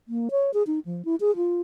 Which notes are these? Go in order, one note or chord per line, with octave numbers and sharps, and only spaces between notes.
A#3
C#5
G#4
D#4
F3
E4
G#4
F4